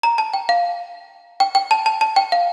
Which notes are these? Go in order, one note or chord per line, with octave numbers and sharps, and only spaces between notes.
A#5
A5
G5
F5
G5
G5
A5
A5
A5
G5
F5